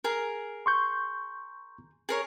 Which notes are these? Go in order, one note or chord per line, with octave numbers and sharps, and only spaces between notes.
G#4 A#4
C6 C#6 G6
G#4 A#4 C#5